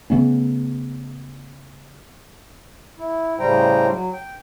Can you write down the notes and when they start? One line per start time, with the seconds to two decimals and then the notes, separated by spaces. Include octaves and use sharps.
0.10 C#3 A3 B3 C#4
2.99 E4
3.39 A2 C#3 G3 C5 G5 A#5
3.91 F#3
4.13 G5